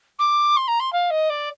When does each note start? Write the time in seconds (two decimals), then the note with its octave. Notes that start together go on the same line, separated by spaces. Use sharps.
0.19 D6
0.56 C6
0.67 A#5
0.79 C6
0.92 F5
1.10 D#5
1.29 D5